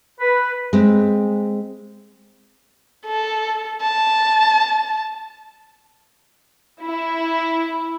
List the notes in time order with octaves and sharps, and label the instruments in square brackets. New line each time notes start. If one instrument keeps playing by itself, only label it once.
[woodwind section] B4
[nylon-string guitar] G#3 C4
[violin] A4
A5
[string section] E4